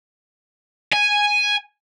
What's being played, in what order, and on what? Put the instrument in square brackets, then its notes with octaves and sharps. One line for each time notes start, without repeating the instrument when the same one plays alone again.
[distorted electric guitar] G#5